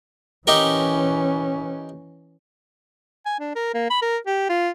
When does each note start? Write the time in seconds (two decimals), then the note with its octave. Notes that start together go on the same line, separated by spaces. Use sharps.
0.47 E3 C#4 D#4 G4 A#4
3.26 G#5
3.39 D4
3.56 A#4
3.74 A#3
3.90 B5
4.02 A#4
4.27 G4
4.49 F4